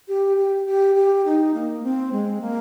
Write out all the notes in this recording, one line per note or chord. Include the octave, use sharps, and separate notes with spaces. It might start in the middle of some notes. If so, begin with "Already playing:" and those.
G4
G4
G4
G4
D#4
A#3
C4
G#3
A#3